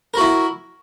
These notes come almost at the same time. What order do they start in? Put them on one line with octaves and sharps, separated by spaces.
A#4 F#4 E4